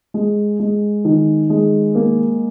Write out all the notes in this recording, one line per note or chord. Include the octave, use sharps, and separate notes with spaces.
G#3
G#3
D#3
G#3
A#3